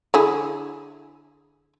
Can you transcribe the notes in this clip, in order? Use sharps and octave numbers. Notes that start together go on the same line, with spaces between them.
D3 E4 G#4